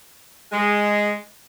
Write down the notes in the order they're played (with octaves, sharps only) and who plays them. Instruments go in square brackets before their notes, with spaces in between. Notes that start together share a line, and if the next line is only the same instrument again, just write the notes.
[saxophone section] G#3